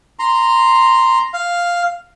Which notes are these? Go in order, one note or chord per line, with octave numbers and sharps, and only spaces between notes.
A#5 C6
F5